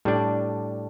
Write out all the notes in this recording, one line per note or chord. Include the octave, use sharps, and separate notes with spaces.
A2 G3 D4